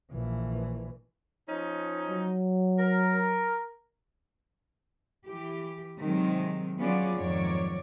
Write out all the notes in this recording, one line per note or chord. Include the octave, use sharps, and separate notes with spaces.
A#1 E3
F3 C#4 D#4
F#3
A#4
E3 G4
C3 D#3 F#3 G#3 C4
F#3 B3 C#4 F4 G#4 D5
F2 G#2 D#3 F#3 C#5 D5